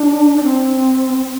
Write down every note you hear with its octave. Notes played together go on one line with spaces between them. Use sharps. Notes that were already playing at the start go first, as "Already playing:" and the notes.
Already playing: D4
D4
C4